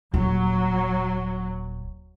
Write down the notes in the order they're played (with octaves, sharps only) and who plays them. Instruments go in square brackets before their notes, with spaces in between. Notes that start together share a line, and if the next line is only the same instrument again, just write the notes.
[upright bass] D#1 [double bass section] F#3